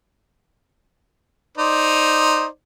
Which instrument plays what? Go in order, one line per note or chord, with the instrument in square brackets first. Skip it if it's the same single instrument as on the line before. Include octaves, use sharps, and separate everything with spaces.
[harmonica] D#4 C5 D5